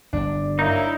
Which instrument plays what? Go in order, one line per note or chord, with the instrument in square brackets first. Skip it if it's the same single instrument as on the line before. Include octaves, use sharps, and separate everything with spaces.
[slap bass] G1 [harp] D4
[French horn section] F#3 A#3 E4 [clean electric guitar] D#4